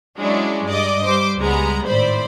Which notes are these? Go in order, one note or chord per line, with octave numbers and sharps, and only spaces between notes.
F#3 G#3 C#4 D4 E4
G2 D5 D#5 D6
G3 C5 D6
C#2 G3 G#3 B3 A#5
G#1 A2 C5 D5 B5